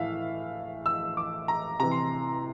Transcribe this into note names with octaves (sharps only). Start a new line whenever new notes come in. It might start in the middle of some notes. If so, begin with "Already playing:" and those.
Already playing: A2 E3 E5 F5
E6
D6
A#5
C3 E3 A#5
C6